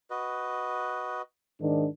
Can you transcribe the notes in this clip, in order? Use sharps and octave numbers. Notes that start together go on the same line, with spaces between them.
F#4 B4 D#5
G#2 D#3 D4